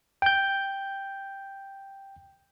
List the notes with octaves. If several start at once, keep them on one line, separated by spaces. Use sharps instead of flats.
G5 G6